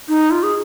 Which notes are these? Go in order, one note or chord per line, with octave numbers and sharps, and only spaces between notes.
D#4
F4
G#4